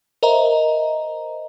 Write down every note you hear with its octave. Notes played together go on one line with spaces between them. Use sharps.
A#4 C5 D#5 E5 A#5